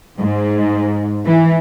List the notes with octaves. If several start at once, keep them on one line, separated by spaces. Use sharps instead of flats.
G#2
E3